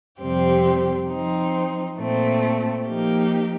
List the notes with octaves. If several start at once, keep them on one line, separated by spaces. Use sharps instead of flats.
F2 C3 G3 C4 G4
F3 C4 D#4
A#2 A3 C4
F3 A#3 D#4 G4